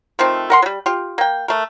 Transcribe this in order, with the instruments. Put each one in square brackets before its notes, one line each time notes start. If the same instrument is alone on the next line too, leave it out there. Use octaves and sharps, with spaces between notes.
[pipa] D#3 F3 A3 C4
A#4 F#5 C6
F#3 G3
F4 G4
A#3 G5
A3 A#4